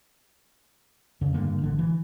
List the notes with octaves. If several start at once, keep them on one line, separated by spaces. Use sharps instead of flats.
F2 C#3
G2 D3 A#3
A1 D3
E3